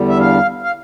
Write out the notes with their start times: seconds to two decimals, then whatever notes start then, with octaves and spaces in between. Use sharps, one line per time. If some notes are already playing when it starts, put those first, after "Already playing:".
Already playing: E2 D3 G3
0.09 E5
0.19 F5
0.62 F5